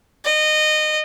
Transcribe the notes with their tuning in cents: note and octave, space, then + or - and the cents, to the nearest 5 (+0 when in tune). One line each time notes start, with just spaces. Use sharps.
D#5 -20